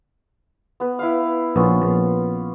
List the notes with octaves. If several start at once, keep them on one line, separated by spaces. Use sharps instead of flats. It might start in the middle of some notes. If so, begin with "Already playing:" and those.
B3 B4
E4 B4 F5
A#1 B3 C#4 F4
A#1